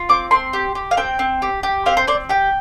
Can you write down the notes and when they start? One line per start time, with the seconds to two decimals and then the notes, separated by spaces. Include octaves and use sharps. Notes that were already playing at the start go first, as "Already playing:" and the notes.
Already playing: F4
0.09 C4 D6
0.31 C4 C6
0.53 G4
0.75 G4
0.91 F5
0.97 C4 G5
1.19 C4
1.42 G4
1.63 G4
1.86 C4 F5
1.97 C5
2.07 C4 D5
2.29 G4 G5